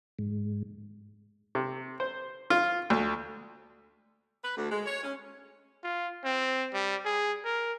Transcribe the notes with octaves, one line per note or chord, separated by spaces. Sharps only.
G#2
C3
C5
F4
D2
B4
D2
G#3
C#5
C#4
F4
C4
G3
G#4
A#4